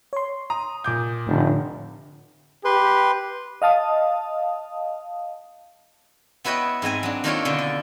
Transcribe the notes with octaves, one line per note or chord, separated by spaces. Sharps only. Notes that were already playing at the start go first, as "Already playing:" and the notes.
C#5 C6
A#5 D#6
A#2 D6 G6
F1 A2 D3
G4 B4 C6
D#5 F5 A5 D#6
B3 E4 B4 C#5 D#5 G5
G#2 G#3 C4 G#5
F#3 D4
D#3 A#3 D4 F4 A4 C#5
B2 D3 C#4 D4
D5